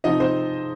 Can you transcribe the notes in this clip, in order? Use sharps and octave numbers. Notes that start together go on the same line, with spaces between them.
C3 F3 C4 D#4 D#5
C4 C5